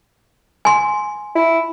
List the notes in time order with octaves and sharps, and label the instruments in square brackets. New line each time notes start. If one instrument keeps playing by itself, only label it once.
[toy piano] G#5 C6
[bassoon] E4